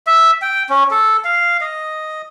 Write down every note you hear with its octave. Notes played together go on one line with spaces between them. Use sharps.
E5
G5
C#4
A4
F5
D#5